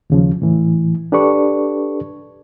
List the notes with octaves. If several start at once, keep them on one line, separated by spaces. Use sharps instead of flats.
D#2 C#3 F3
A2 E3
D4 G4 A4 B4 D5 C#6